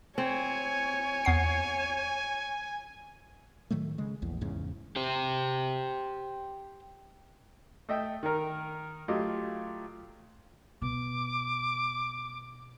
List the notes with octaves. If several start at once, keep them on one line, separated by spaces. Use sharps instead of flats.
C4 C#5 G#5
E2 F#5 C7
A2 D#3 F#3 A3
C#3 G#3
A#1 E2
E2 G#2 C#3
G4 C5
A3 D#5 E5 G5
D#3 A#4
F#3 A3 F4 G4 D#5
B2 D6